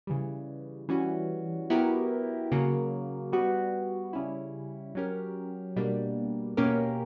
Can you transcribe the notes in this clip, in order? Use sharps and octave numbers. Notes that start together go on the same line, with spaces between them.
C#3 E3 G3
E3 G3 C#4 F#4
F#3 B3 E4 G4 A#4
C#3 F#3 A#3
G3 B3 F#4
C#3 G3 C#4 E4
F#3 C#4 G4 A#4
B2 G3 A#3 D4
B2 A#3 C#4 G4 A#4